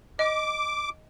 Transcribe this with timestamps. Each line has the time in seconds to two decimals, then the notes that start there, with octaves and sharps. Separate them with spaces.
0.19 D#5 D6